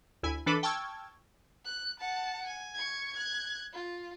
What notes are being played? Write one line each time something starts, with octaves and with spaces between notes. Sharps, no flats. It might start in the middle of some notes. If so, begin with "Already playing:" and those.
D2 E4 G#5
E3 D4 A4 B4 B5
G5 A5 C#6 E6 F6 G#6
F#6
F#5 A5
G#5
C#6 G#6
F#6 G#6
F4